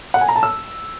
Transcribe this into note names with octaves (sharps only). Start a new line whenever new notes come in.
F#5
G#5
A#5
A5
E6